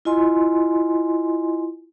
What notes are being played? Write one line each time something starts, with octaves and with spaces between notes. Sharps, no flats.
E4 F4 D#5 G#5 C6